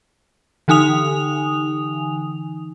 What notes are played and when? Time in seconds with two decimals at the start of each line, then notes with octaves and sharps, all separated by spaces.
0.68 D3 E3 D#4 G#5 D#6 F7